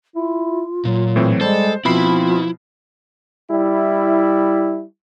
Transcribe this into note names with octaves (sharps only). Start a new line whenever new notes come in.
E4 F4
A#2 F#3
A2 E3 C4
G3 G#3 A4 C5
B2 F3 C4 E4 B5 C7
G3 E4